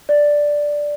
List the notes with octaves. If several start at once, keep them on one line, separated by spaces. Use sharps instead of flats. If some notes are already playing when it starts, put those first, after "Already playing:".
D5